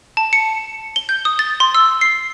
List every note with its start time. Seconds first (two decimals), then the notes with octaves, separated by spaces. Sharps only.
0.17 A5
0.33 C#7
0.96 G7
1.09 G6
1.25 D#6
1.39 A6
1.60 C6
1.75 E6
2.01 C7